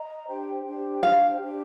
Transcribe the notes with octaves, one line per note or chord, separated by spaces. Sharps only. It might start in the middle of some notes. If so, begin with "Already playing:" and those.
Already playing: D#5 A#5
D4 G4 C5 G5
D4 G4 C5 G5
D4 G4 C5 F5 G5
D4 G4 C5 G5